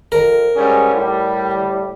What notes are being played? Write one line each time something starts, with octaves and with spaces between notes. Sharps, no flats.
F2 A#4
G#2 G3 C#4 G#4
A2 G3